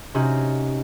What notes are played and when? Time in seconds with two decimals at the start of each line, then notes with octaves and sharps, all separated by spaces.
0.14 C3 C#4 D#4 F#4